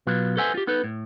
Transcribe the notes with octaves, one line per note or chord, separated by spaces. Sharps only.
B2 F#3 F4 B4
A4 B4 C5 E5 F#5 G#5
F4 G4
B3 D#4 A4 B4
A2